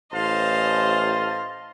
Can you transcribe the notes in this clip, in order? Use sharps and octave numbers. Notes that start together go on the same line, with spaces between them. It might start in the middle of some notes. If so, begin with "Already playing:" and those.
A1 C5 D#5 F5 A5 C6